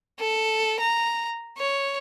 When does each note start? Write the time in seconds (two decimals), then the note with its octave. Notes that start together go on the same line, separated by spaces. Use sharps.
0.20 A4
0.80 A#5
1.58 C#5